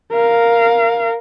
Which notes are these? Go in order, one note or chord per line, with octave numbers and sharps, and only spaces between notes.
A#4 F5